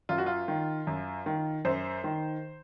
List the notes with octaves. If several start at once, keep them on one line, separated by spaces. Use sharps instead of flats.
F#2 F4
F#4
F4
D#3
F#2
D#3
F#2 C5
D#3